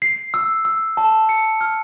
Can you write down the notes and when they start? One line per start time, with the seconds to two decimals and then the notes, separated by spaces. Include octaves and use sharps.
0.02 C7
0.34 E6
0.65 E6
0.97 A5
1.29 C#7
1.61 F6